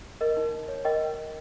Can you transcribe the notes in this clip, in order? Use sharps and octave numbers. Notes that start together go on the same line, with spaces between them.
A#4 D#5
D#4
D#4
C#5
A#4 D#5 G5